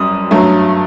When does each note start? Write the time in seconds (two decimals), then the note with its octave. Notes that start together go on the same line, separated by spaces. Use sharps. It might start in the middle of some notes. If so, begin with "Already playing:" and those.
Already playing: F#2 G3 D#6
0.31 G2 F#3 A3